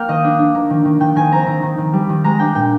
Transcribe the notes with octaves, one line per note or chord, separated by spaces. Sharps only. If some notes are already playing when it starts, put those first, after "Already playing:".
Already playing: A#3 F5 G5
D#3 D#5
D4
D4
A#3
D#3
D#3
D#3 G5
D#3 G#5
C4 A#5
D#3 A#5
D#3
D#3
G3
D#3
G#3 A#5
D4 G5
A#2 G5